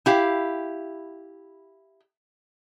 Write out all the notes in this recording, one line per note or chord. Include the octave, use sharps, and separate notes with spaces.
E4 G4 F5